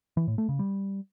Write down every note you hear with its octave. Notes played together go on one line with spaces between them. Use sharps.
E3
A2
A3
C#3
G3